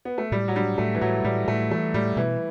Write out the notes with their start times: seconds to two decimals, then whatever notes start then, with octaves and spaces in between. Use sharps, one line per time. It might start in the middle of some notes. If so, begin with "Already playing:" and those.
0.05 B3
0.18 A3
0.32 A2 G3
0.48 F#3
0.56 G3 D4
0.78 A2 A3
0.95 E3
1.01 A2 F#3
1.25 A2 G3
1.48 A2 A3
1.71 E3 A3
1.94 A2 G3
2.16 B2 E3